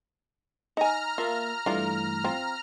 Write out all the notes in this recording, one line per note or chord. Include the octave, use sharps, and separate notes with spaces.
D#4 G#5 A#5 F6
A#3 F4 E5 A5
G2 E3 A3 D4 F4
C4 F4